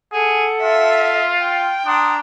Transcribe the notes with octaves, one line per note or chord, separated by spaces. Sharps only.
G#4 A4 F#5
F4 E5
G5
D4 A#5 C6 D#6